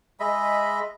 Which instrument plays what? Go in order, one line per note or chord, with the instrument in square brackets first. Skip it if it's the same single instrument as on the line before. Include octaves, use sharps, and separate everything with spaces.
[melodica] G#3 D#5 E5 B5